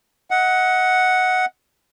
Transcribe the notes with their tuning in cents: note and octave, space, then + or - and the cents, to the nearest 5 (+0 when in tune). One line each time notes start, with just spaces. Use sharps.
D#5 +35 F#5 +0